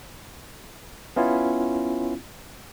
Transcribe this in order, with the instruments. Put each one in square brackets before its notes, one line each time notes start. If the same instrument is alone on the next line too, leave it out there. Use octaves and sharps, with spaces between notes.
[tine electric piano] B3 C#4 E4 F4